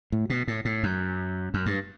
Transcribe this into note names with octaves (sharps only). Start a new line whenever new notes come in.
A2
B2
A2
A2
F#2
F#2
G2